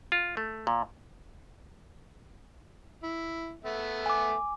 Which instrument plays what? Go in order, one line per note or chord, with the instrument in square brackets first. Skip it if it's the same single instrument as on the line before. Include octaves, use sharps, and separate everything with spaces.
[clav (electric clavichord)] F4
A3
A#2
[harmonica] E4
A3 B3 E5
[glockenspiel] G#5 D6